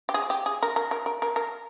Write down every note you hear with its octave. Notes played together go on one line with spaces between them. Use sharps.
G4
G#4
G4
G#4
A#4
A#4
A#4
A#4
A#4
A#4